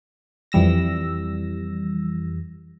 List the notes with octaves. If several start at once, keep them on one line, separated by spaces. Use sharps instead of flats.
F2 E3 G3 E6 A#6